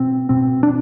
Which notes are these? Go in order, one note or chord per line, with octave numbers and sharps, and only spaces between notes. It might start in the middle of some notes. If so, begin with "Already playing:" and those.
Already playing: B2 C4
B2 C4
D4